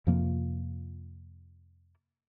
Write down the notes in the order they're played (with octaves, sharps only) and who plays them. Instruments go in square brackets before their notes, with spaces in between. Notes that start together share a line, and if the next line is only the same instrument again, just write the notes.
[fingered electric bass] F2 C3 F3 A#3